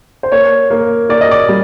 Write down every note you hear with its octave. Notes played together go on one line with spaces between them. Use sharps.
C5
A#3 C#5
A#3
A#3 D5
D#5
D5
G3